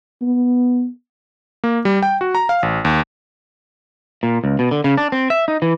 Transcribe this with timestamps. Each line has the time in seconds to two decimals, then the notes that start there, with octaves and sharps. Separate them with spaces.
0.22 B3
1.64 A#3
1.85 G3
2.03 G5
2.21 F#4
2.35 A#5
2.49 F5
2.63 A1
2.85 D#2
4.23 A#2
4.44 C#2
4.59 B2
4.71 D3
4.84 C#3
4.98 D4
5.12 C4
5.30 E5
5.48 D#4
5.62 E3